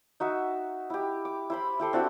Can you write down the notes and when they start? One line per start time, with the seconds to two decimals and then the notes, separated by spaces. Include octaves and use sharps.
0.20 D#4 F#4 E5
0.90 E4 G4
1.25 D6
1.50 E4 C5 B5
1.79 E4 G4 A4 C6
1.93 C4 D4 E4 F#4